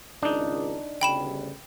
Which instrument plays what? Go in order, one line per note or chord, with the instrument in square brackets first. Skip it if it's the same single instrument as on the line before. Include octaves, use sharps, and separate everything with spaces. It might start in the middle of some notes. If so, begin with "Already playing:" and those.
[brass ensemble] G#1 C#2 [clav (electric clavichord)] D4 D#4
[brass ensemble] G1 D2 C#3 [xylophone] G5 B5 E7